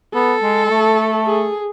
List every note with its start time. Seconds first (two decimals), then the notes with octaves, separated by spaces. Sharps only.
0.14 B3 A4
0.42 G#3
0.65 G#3
0.70 A3
1.26 G#4